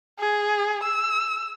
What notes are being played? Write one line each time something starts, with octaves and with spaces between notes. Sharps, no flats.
G#4
E6